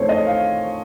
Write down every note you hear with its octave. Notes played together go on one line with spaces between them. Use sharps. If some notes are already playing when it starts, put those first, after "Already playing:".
Already playing: A#1 A#2 A3 C4 D#4 C5 C#5
D#5
F5